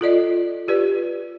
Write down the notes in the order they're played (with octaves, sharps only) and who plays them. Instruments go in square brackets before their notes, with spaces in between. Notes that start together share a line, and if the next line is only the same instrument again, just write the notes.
[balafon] F4 A4 D5 D#5
F4 G4 B4 D5